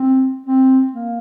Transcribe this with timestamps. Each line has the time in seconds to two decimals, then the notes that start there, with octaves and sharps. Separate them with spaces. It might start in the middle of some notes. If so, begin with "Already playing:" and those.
Already playing: C4
0.46 C4
0.93 A#3